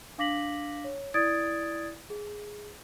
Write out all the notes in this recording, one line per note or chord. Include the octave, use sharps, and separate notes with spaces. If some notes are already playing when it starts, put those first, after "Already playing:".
D4 F5 D6 A#6 B6 F#7
C#5
E4 D5 D#6 G#6 A6 D7
G#4